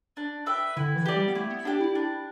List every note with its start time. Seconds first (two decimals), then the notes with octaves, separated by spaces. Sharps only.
0.17 D4
0.46 B4 E5 G5
0.76 D3 E4
0.96 E3
1.06 G4 D5
1.16 G3
1.28 B3
1.35 A3 E4
1.50 B3
1.65 D4 G4 D5
1.81 E4
1.95 D4